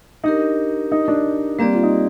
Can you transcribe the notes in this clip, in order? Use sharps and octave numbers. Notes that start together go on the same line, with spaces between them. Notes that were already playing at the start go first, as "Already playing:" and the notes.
D4 D#4 G4 A#4
D#4
D4
G3 A#3 C4 G4 D5
F4
D#4